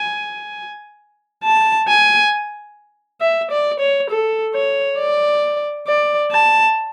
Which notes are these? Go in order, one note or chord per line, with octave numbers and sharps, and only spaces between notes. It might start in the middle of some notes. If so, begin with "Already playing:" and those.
Already playing: G#5
A5
G#5
E5
D5
C#5
A4
C#5
D5
D5
A5